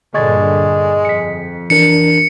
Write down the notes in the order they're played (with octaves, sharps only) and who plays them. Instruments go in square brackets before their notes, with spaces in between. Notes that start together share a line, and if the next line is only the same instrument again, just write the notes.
[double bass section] G2 A#2 D3 [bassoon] G#3 [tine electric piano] C#6 G#6 A6
[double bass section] F2 [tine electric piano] B6 C#7
[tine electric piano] E3 D4 A#4 [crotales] C#7